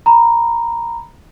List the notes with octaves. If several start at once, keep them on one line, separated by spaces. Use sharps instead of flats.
A#5 B5